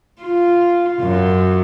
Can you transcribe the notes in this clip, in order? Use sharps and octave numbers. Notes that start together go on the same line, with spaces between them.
F4
F#2 F#3